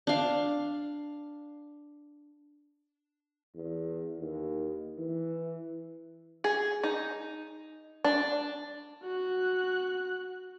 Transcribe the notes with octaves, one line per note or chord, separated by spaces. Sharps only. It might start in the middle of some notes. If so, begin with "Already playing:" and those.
D4 F5
E2
D#2
E3
G#4
D#4
D4
F#4 F#6